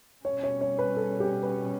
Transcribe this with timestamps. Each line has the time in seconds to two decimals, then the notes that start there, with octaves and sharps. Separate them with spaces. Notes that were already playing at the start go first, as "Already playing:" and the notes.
0.25 B2 G3 C#4 C#5
0.43 C#5
0.61 C#5
0.79 B4
0.97 A4
1.20 G4
1.43 B4